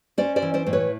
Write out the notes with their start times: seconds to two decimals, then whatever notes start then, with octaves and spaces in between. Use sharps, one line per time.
0.18 C#4 C5 D5
0.36 C5 D5
0.42 E3
0.54 C5 D5
0.66 A2 C5
0.73 B4 C#5